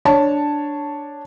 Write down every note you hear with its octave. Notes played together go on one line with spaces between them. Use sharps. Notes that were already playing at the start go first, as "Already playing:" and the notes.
D4 C#5 A5